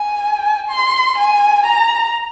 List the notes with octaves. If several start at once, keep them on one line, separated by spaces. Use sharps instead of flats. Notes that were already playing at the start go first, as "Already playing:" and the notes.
Already playing: G#5
C6
G#5
A#5